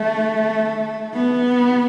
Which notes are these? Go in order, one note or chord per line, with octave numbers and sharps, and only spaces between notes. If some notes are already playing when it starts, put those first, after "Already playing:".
Already playing: A3
B3